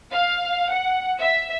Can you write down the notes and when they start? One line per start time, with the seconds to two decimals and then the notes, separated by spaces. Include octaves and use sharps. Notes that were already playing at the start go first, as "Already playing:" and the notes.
0.10 F5
0.70 F#5
1.20 E5